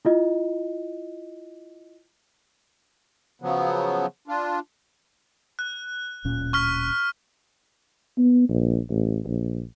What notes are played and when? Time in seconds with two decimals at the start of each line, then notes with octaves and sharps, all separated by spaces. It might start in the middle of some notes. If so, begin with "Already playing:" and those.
0.05 E4 F4 D#5
3.42 C#3 F3 F#3 B3
4.28 D4 F4
5.59 F#6
6.25 D1 A#2 C#4
6.53 C#6 F6 B6
8.18 B3
8.49 A#1
8.90 A1
9.27 A#1